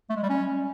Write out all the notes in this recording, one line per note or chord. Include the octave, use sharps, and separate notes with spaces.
A3
G#3
G3
C#4